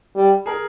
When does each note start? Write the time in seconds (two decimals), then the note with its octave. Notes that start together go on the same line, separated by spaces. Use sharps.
0.16 G3
0.46 G#4 A#4